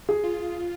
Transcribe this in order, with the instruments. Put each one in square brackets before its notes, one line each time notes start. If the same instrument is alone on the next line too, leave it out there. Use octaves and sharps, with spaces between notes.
[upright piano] G#4
[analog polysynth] F4